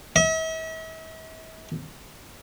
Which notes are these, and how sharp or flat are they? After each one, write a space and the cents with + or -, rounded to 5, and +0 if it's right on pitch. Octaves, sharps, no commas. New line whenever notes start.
E5 -45